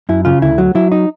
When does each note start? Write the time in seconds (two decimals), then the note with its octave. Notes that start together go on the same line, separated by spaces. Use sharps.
0.09 F#2 E4
0.25 C#3 F4
0.42 D2 E4
0.58 F#3
0.75 F#3 E4
0.92 D#4